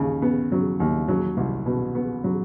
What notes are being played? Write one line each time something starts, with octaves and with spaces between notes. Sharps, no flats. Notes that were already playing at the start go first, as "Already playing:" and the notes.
Already playing: D#2 C#3
B3
F#3
D#2
F#3
C2
B2
B3
F#3